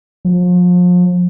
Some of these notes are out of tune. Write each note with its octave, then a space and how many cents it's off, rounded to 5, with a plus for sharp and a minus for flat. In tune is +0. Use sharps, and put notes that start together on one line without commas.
F3 +35